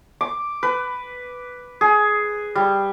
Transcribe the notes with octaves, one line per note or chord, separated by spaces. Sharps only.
D6
B4
G#4
G3